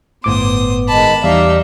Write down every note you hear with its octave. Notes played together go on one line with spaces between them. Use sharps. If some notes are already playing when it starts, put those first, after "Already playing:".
G1 A2 B3 C5 D6 D#6
D#3 G#3 A5 B5
E2 G3 D#4 D5 E5 F5